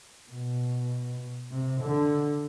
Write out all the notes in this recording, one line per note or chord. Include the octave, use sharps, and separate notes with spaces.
B2
C3
D3